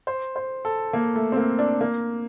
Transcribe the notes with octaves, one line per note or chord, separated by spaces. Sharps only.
C5
C5
A4
A#3
A3
C4
A#3
D4
A#3